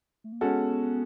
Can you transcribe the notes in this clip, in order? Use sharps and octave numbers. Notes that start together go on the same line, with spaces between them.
A3
A#3
G#3 B3 C#4 F#4 A4